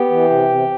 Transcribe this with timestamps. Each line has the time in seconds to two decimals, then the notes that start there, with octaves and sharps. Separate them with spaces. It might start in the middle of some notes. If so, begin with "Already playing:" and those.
Already playing: B3 G4 G5
0.11 E3
0.29 C3
0.49 C3